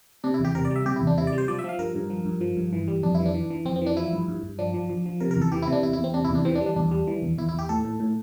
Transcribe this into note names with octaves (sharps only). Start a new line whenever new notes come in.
C3 D4
E4
E2 G4
C3 A#4
D5
G3
E5
C3 G4
E4
E2
D4
C3 E4
D5
G3
C5
F3 D5
E5
F3 F5
G2 A#4
G2
F3
G2
F3
G2
E3
G3
F2 D4
E3 E4
D4
E3
E3
F2 C4
C4
E3
D4
F3 E4
G2
G2
G2
F3 D4
F3
F3
F3
C3 A#4
A#4
E2
A4
E3 G4
E4
C3
D4
E2 E4
E4
E2
C4
C3 D4
E4
E2
D4
E3 C4
D4
G3
D4
E2 D4
G3
E3
E2
E2 E4
E4
E2 G4
A2 A4
A2
A2